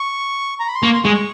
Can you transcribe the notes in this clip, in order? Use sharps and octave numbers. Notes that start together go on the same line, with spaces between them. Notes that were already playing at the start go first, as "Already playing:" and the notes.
Already playing: C#6
A#5
B5
C6
A#3 C#6
C6
G#3 C#6
C#6